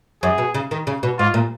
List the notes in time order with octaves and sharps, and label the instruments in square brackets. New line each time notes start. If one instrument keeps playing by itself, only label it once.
[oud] F#2 [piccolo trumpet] G#4
[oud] B2
C#3
D#3
C#3
B2
[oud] G#2 [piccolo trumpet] F4
[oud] A#2